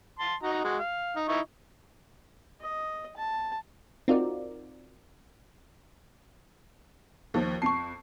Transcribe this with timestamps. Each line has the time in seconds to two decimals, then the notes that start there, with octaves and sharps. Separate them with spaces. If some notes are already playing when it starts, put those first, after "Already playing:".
0.19 A5 C6
0.43 D#4 F#4 A#5
0.64 G#3 F#4
0.79 F5
1.16 D#4
1.29 D#4 E4 C#6
2.61 D#5
3.17 A5
4.08 C4 D#4 F4 F#4 A#4 D5
7.34 D#2 F3
7.62 F2 A5 C#6 C7